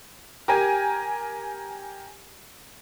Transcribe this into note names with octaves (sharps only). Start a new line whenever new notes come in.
G4 A#4 G#5